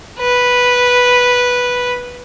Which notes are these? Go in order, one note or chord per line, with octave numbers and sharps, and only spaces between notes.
B4